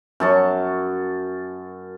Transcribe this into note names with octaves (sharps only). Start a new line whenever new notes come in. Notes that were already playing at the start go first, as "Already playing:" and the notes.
F#2 A5 C#6